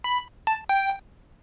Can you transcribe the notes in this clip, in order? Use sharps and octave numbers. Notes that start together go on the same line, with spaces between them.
B5
A5
G5